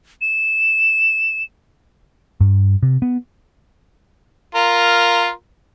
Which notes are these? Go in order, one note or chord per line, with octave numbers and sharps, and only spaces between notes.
E7
G2
C3
B3
F4 A#4